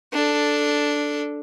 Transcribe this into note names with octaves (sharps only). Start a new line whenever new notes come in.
D4 A4